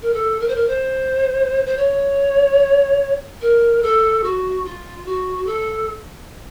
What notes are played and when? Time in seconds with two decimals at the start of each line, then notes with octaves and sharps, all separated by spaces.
0.02 A#4
0.13 A4
0.40 A#4
0.48 C5
0.55 A#4
0.68 C5
1.66 C5
1.77 C#5
3.41 A#4
3.82 A4
4.23 F#4
4.65 F4
5.06 F#4
5.46 A4